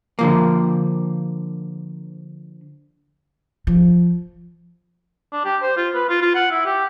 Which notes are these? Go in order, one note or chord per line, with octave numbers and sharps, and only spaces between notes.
D3 F3 A#3
F3
D4
G4
C5
F4
B4
F4
F4
F#5
E4
G4